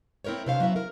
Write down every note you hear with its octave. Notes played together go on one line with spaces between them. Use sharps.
C4 E4 A#4 C5 C#5
C3 D4 C5 C#5 F5
F#3 B3 C#4 E4 E5
A#4